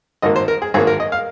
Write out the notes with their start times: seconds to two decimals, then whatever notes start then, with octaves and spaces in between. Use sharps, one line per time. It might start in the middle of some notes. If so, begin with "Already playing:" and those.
0.22 G#1 G#2 D#3 A#3 D#5
0.36 C5
0.48 A#4
0.62 G#4
0.74 G#1 G#2 D#3 A#3 G#4
0.87 A#4
1.00 D#5
1.12 F5